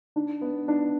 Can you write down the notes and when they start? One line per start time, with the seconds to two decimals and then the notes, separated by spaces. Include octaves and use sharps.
0.16 D4
0.41 B3
0.68 D4